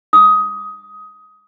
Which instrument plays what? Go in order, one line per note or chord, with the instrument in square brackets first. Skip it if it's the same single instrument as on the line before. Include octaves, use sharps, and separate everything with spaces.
[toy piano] D6 D#6